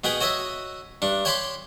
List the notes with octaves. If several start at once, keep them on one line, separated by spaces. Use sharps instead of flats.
B2 B3 G#4 G5
F#4 C#5 D#5 E5
G2 D4
C#5 G5 A5 B5 C6 D6